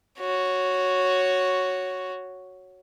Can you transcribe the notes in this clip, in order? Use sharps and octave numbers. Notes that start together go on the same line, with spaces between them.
F#4 C#5